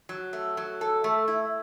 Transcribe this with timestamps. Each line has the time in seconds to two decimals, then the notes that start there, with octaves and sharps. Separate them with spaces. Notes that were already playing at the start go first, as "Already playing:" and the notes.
0.09 F#3
0.33 A3
0.57 F#3
0.81 A4
1.04 A3
1.28 E4